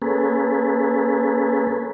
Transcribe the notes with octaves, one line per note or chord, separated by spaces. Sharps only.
A#3 C#4 G#4 A4 B4